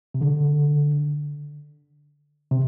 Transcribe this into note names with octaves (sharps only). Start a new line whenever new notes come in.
C3
D3
C3